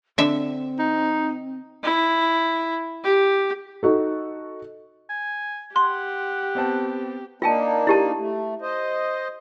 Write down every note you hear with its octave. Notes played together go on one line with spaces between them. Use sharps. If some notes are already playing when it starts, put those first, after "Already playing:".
D3 C4 E5
D#4
E4
G4
D#4 F#4 A4
G#5
G4 F#5 C6
B3 C4 A5
A#3 D4 D#4 F4 G5 A5
E4 G4 A5
A3
C5 D#5